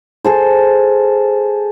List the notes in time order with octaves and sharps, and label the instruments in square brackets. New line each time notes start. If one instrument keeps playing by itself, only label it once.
[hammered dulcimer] G#4 A4 C5